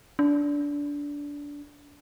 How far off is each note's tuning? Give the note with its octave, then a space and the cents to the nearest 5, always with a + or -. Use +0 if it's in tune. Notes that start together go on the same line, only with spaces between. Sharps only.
D4 -20